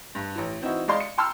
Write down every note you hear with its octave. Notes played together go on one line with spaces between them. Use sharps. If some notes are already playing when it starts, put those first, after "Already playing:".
G2
A1 E3
E3 C4 D#4 E4 F#4
G#3 D5 F5 C6
C#7
G5 A5 A#5 C6 E6 F6